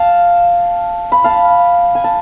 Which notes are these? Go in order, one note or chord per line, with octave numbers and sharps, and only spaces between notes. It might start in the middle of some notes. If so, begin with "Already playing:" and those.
Already playing: F5 A5
B5
F5 A5
G#5
A5